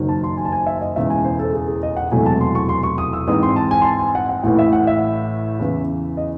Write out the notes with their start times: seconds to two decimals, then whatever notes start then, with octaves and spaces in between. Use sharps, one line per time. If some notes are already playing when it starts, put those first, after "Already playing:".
Already playing: F#1 F#2 D#3 F#3
0.09 A5
0.24 C6
0.37 G#5
0.45 A5
0.52 G#5
0.66 E5
0.81 D#5
0.96 E1 E2 C#3 E5
1.10 G#5
1.25 C5
1.39 A4
1.53 G#4
1.68 G#4
1.83 D#5
1.97 F#5
2.11 E1 E2 C3 F#3 A3 G#5
2.26 A5
2.41 C6
2.55 C#6
2.69 C6
2.83 C#6
2.98 D#6
3.13 E6
3.27 G#2 E3 G#3 C4 D#6
3.43 C6
3.56 A5
3.71 G#5
3.82 C6
3.85 A5
4.00 G#5
4.15 F#5
4.29 F#5
4.43 A1 A2 E3 F#5
4.59 E5
4.73 F#5
4.87 E5
5.59 E2 C#3 E3
6.17 D#5